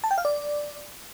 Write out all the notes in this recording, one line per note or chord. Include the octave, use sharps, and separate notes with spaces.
A5
G5
F5
D5